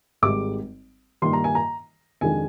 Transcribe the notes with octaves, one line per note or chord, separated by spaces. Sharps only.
G#1 G#2 G3 D6
G2 D#3 A#3 D#4 C6
A#5
G#5
A#5
F2 C3 D#3 G#3 D4 G#5